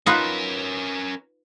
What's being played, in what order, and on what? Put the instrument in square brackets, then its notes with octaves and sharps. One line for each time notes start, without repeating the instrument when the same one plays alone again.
[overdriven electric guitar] C#4 A#4 [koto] D#4 F4 B4